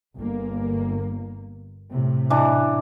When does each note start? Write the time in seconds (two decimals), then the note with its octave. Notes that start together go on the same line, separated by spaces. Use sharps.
0.16 G1 A#3
1.90 A2 C3
2.30 E3 D4